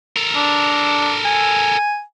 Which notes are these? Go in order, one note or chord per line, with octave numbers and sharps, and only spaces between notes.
A4 A#4
D4
G#5